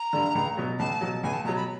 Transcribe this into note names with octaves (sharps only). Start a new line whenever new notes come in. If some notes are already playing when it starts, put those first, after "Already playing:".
Already playing: A#5
G2 D3
C#2
B2 F#3
C#2 A5
B2 F#3
C#2 G#5
A5
B2 F#3 A#5
B5